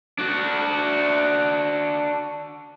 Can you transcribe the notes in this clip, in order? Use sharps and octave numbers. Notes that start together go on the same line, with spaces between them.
D4 F#4